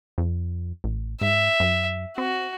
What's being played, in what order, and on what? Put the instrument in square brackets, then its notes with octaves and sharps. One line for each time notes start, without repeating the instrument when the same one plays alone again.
[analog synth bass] F2
A1
[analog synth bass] G#2 [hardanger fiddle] E5
[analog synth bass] F#2
[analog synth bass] C4 [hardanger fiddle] F#4